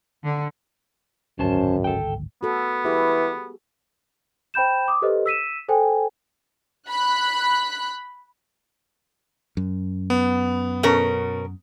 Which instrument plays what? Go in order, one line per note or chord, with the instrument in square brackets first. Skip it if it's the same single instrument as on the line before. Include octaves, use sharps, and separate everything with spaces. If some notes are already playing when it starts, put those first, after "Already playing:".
[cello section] D3
[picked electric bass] D1 G#1 [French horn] F#2 [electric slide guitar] C#4 C5 A5
[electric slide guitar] A4 G5
[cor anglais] B3 [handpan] F#4 A4
[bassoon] E3 [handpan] G4 G#4
[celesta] C5 G5 B5 G6 E7
D6 D#6
G4 A4 B4 C5 D#5
E6 B6 D#7 E7
A4 C5 G5 G#5
[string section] B5 F#6
[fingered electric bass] F#2
[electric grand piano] B3
[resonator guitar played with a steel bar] B2 C#4 A#4